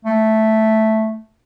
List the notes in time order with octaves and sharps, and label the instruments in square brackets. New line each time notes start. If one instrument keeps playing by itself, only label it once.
[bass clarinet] A3